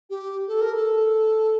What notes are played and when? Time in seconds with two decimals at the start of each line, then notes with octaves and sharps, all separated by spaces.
0.10 G4
0.48 A4
0.61 A#4
0.75 A4